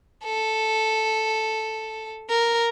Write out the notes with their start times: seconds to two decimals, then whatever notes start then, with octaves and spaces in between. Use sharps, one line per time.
0.25 A4
2.30 A#4